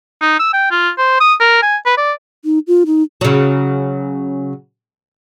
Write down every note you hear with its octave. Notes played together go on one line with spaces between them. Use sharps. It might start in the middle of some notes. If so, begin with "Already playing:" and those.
D#4
E6
G5
F4
C5
D#6
A#4
G#5
B4
D5
D#4
F4
D#4
C#3 F#3